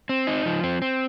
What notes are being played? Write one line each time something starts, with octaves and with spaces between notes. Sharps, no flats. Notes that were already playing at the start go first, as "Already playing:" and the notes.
C4
D#4
F3
C4
C4